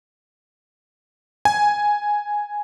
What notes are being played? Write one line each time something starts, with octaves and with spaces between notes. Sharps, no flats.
G#5